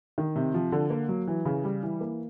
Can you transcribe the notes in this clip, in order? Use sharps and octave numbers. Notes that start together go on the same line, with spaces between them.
D#3
C3
F3
D3
A#3
F#3
E3
C#3
G3
E3
A#3